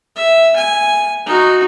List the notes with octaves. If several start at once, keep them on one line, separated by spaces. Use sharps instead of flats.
E5
G#5
D#4 F#4